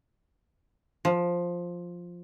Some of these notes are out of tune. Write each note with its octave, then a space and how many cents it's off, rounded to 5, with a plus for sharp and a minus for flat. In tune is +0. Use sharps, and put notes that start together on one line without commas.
F3 +5